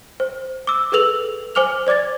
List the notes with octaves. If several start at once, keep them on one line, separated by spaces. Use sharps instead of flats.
C5
D6 E6
G#4 A4 B4 E6 F7 F#7
C5 G#5 D6 F6 F7
C5 D5 D6 G#6 A6